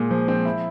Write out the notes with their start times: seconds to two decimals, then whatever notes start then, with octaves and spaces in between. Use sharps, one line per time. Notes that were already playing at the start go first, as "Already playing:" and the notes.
Already playing: A#2 G#3
0.11 F3
0.28 C4
0.45 E4